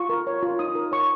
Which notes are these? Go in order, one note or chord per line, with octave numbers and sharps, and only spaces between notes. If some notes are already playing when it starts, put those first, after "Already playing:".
Already playing: F4 C#6
A#4
C#5
F4
D#4 D#6
A#4
C#5 C#6